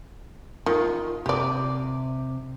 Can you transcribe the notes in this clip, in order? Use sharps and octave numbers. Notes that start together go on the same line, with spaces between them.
D#3 F4
C3 G4 D5